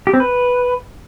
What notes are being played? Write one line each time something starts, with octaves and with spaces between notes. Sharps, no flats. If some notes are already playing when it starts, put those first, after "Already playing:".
G4
C4
B4